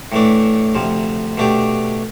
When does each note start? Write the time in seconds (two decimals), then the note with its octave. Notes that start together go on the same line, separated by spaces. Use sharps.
0.12 A2 E3 A3 D4
0.75 D2 C3 F3
1.37 B2 A3 D4 G4